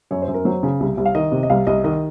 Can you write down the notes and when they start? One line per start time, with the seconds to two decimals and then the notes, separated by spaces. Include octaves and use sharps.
0.11 F#2 C#5
0.22 C5
0.28 F#2
0.34 A#4
0.45 F#3 C5
0.63 C#3
0.80 C2
0.97 C2
1.06 F5
1.15 D#3 D#5
1.32 C3
1.43 D#5
1.50 C2 F5
1.67 C2 D#5
1.84 D#3 D#5